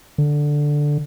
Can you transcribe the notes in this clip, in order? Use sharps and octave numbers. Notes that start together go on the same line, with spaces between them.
D3